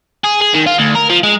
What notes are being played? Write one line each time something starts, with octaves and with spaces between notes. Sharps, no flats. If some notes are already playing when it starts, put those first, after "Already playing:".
G#4
G#4
D#3
F4
D2
A#4
F3
G#3